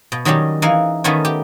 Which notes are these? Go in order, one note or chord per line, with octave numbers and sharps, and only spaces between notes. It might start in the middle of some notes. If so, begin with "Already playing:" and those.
B2
D#3 F#3 G3 C#4 G4
E3 D#4 G#4 F5
D#3 A3 B3 C#4 A#4 C#5
G4